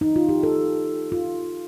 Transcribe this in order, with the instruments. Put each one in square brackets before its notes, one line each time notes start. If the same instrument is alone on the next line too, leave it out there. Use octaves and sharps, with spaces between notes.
[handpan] D#4
F4
G4
A4
F4